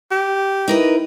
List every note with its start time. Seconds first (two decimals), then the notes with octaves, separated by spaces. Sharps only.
0.11 G4
0.68 D#4 E4 A#4 B4